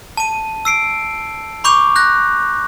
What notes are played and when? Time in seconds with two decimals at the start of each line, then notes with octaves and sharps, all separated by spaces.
0.17 A5 D#7
0.65 E6 C7 D7
1.64 B5 C#6 D6 G6 F7
1.96 F#6 G6 A#6